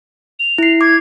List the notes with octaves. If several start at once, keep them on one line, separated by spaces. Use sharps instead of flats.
F7
E4 C7
D6 G#6